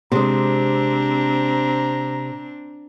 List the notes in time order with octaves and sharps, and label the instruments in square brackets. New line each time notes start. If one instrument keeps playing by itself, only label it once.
[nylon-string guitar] C3 G#3 [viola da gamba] C4 D4 [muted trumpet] A#5